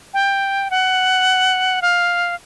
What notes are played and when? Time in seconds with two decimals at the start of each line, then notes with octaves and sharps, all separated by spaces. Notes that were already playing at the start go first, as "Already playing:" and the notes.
0.14 G5
0.71 F#5
1.82 F5